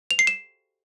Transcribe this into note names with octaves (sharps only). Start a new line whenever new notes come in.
F7
C7
E7